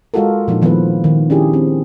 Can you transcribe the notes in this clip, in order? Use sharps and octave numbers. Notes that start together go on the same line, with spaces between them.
G#3 F4 F#4 A4 A#4
A#2 F3 D4 D#4
D#3 F3 B3 E4 B4
D#3
C#4 D4 E4 G4 G#4
C4